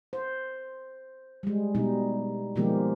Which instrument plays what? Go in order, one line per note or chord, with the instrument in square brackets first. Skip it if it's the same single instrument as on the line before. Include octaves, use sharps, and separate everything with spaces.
[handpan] C5
G3 G#3
B2 G3 D#4
B2 D#3 F3 G#3 A#3 G4